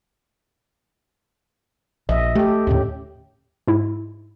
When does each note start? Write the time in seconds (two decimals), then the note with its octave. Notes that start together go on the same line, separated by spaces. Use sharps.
2.09 A#1 D#5 E5
2.35 A3 G4 A4
2.67 D#2 A2 D3 C#4 G4
3.68 G#2 E4